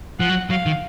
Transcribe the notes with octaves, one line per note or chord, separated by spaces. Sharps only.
F3 F#5
F#3
F#3 F5
D#3